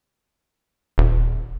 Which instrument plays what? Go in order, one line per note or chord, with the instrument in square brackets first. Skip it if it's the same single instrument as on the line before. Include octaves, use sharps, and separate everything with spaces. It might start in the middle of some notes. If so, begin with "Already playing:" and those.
[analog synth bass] D#1